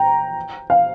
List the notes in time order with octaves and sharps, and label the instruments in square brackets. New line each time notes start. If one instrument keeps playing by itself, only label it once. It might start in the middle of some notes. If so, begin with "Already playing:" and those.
Already playing: [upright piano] G5 A#5
F5